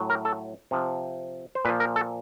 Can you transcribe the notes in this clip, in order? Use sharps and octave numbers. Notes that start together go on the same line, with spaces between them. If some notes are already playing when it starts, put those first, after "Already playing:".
Already playing: A2 F#3
A#4
A4
C3 F3
C5
A#2 F3 B4
A#4
A4